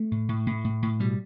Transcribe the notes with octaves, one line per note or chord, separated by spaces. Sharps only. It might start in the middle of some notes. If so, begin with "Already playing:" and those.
Already playing: A3
A2
A2
A2
A2
A2
B2 G3